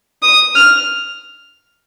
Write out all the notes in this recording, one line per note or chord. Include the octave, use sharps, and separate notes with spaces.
D#6
F6